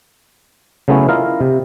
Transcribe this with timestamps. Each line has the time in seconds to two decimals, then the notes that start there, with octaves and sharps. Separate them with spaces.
0.88 C#3 F#3 A3 B3 C#4 E4
1.08 E4 F4 A#4 D#5 F5
1.41 C3